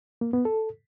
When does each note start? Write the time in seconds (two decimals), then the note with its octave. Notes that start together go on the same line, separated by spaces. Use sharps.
0.21 A#3
0.33 B3
0.45 A4